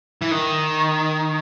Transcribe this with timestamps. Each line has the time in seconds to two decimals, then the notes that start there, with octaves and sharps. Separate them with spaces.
0.22 E3
0.31 D#3